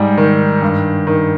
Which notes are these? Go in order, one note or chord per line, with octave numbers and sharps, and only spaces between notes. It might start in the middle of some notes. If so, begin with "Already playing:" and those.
Already playing: G#2 G3
D#3
G2
D#3